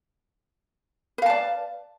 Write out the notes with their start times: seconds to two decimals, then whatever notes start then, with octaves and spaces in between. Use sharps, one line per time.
1.18 B4
1.22 F5
1.26 A5
1.30 D5